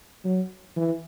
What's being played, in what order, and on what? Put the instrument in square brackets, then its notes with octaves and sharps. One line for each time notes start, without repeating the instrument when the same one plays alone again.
[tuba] F#3
E3